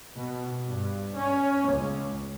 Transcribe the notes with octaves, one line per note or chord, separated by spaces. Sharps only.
B2
G2
C#4
C#2